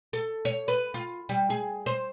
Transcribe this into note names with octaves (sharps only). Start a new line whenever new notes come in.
A4
C#5
B4
F4
G3
G#4
C5